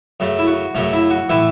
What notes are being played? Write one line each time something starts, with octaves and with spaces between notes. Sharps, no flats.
F#2 C#3 A3
E4
F#4
F#2 C#3 A3 C#4
E4
F#4
A2 E3 A3 E4